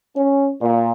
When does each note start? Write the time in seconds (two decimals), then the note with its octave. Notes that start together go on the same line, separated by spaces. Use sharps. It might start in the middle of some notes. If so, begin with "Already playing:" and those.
0.15 C#4
0.61 A#2